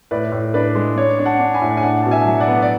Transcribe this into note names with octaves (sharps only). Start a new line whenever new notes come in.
A2 B4 D5
A2
D4 B4 D5
G#3
D4 C#5
D4
F#5 A5
D4
G#5 B5
A2
G#5
D4 F#5 A5
B2 A5
E5 G#5
F#3
D5 F#5
B3
D5